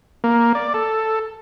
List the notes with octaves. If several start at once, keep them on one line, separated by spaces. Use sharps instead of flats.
A#3
D5
A4